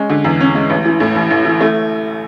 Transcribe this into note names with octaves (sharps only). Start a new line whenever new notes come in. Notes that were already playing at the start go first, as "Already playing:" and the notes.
Already playing: G#3 C#4
D3
E2
C#4
G#3
A1
E3
A2
A1
A1
E3
A3